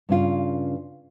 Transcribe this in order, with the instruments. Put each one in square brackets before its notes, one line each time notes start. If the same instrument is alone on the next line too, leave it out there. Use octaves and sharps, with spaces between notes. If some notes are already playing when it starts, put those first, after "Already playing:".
[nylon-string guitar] G2 C#3 F4